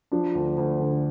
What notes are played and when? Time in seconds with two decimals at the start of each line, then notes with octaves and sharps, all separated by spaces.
0.12 F3 D4
0.35 D2
0.58 D2
0.80 D3